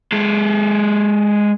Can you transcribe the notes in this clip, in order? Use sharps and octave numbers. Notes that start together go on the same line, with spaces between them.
G#3 A4